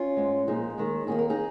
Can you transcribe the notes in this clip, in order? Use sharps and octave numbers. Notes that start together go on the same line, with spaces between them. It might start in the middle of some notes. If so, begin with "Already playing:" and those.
Already playing: C#4 F4
G#2 G#3
A#2 F3 G#3 D#4 G#4
D#2 D#3 G#3
D#2 D#3 A#3 G#4
A#4
D#4 G#4